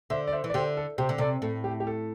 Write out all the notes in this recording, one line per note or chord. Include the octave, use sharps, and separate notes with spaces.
D3 C5 E5
D5
C5 E5
E3
D5
D3 G4 C5
A4
C3 G4 C5
D3
C3 A4 D5
A2 A4
G4
G4
A4